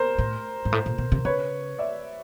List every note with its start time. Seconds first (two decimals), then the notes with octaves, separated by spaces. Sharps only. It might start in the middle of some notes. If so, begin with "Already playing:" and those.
Already playing: A#4 C5
0.19 A2
0.65 G#2
0.72 A2
0.86 A#2
0.98 B2
1.12 C3
1.25 C#3 B4 C#5
1.78 D5 E5